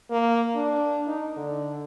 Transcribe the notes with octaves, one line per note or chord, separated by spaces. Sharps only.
A#3
D4
D#4
D3